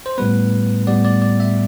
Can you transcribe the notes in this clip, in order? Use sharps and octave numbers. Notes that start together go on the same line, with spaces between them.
C5
A2 G3 B3 B4
A2 G3 B3 D5
D5
D5
E5